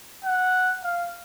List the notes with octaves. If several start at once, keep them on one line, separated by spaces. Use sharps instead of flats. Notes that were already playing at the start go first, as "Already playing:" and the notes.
F#5
F5